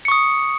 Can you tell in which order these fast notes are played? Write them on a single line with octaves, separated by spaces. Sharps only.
C#7 C#6 D#6